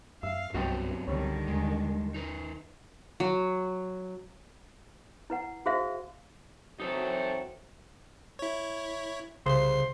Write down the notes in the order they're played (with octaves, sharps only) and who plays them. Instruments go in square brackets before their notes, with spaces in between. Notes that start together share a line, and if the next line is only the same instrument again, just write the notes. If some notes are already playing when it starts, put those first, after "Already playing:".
[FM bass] F#2 [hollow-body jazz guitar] E5 [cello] F5
[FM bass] C2 [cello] G2 [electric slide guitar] F#3 B3 C4 [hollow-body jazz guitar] F#4 D#5 G5
[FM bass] C#2 [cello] D3 D#3 [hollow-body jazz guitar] G3 C#5
[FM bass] D#2 [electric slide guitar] G#3
[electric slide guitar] D#4 A#4 B4
[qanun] F#3
[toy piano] E4 B4 F#5
F#4 G#4 C5 E5 F5
[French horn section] E3 F#3 C4 [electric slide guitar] D#4 A4
[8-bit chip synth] E4 C#5
[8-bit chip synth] C2 C7 [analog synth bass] C#3 [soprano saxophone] C5